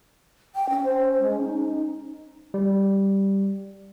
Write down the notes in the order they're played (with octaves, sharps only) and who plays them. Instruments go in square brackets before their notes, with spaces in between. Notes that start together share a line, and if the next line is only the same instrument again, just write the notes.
[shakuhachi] G5
C#4
[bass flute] C5
G#3
D#4
[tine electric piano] G3